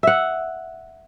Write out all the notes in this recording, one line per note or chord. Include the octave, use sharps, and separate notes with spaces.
E5 F#5